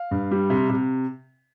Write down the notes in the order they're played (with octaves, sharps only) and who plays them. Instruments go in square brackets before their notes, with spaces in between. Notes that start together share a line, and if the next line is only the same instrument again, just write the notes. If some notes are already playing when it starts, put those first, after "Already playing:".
Already playing: [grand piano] F5
G2
G3
C3
C3